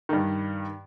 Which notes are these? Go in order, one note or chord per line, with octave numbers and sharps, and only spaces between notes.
G2 D#3